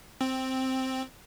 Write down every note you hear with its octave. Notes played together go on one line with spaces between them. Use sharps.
C4